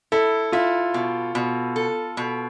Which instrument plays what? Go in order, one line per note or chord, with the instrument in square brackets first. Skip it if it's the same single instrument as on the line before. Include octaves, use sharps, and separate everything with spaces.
[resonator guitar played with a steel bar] E4 [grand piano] A4
[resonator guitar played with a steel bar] E4 [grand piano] F4
[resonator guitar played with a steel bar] B2
B2
A4
B2